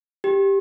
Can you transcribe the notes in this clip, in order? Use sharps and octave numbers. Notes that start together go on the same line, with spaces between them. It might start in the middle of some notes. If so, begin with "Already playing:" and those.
G4